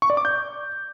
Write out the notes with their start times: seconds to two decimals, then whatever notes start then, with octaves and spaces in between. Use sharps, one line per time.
0.02 C#6
0.10 D5
0.17 D6
0.25 G6